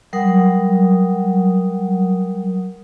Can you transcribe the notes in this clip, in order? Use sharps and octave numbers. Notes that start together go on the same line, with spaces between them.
F#3 G3 A#4 F#5 D#6